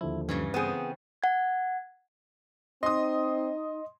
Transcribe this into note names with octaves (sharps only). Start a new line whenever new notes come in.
D#2 D3 F3 E4
G2 C#3 E3 C#4
B3 C4 G#4 C5 G5
F#5 G#6
C4 D#4 D#5 C6 D#6